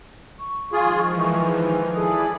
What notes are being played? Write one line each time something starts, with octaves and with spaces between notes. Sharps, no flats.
C#6
D#3 F3 G#3 F4 G#4
E3
G#4 A4 D5 B5 D#6